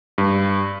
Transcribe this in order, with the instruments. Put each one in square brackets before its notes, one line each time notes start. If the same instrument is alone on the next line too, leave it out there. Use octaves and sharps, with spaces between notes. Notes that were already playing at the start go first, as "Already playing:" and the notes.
[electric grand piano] G2